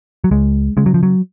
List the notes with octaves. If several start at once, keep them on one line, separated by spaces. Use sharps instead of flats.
F#3
C#2 G#3
C#3 G#3
F#3
F3
F#3